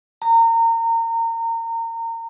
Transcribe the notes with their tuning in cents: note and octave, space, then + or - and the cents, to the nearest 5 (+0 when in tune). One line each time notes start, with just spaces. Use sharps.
A#5 -30